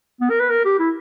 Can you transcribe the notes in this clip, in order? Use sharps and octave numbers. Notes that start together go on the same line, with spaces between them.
B3
A#4
B4
A#4
G4
E4